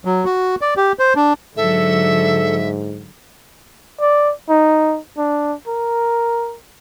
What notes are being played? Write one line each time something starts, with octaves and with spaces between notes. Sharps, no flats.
F#3
F#4
D5
G4
C5
D4
G#2 D3 F#3 A4 E5
D5
D#4
D4
A#4